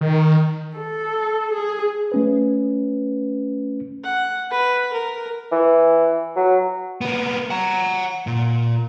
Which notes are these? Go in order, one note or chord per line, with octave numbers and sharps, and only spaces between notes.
D#3
A4
G#4
A3 C#4 B4
F#5
B4
A#4
E3
F#3
A#3 B3
F#5 A#5
A#2